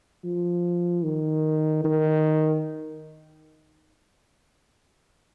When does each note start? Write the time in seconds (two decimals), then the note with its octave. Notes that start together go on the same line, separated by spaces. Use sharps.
0.24 F3
1.04 D#3
1.84 D#3